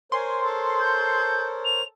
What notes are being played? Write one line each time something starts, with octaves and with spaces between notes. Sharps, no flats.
A#4 C5 C#5 G#5 C6
A4
G6
F7